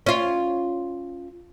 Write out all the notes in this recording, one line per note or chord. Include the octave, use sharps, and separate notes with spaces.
C#4 F4